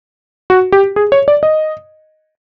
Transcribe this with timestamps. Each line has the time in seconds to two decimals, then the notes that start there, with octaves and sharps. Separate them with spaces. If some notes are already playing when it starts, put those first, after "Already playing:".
0.50 F#4
0.72 G4
0.96 G#4
1.12 C#5
1.28 D5
1.43 D#5